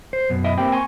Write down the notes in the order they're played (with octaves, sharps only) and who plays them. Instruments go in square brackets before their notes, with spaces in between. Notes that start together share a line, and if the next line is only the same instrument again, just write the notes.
[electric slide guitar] C5
F#2 B2
[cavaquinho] E4 D#5 D#6
[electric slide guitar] A#3 C4 [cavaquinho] G4 B5
[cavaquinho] G#5 C6 C#6